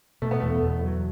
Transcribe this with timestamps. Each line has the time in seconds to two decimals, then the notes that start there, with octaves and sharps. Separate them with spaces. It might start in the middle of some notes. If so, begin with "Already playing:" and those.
0.22 B2 A3
0.31 B3
0.40 E2 A3
0.62 E2
0.83 F#3